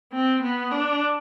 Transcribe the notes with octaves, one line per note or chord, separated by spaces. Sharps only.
C4
B3
D4